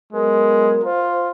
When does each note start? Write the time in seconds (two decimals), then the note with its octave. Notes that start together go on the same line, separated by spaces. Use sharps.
0.13 F#3 G#3 B3 A#4
0.84 F4 C5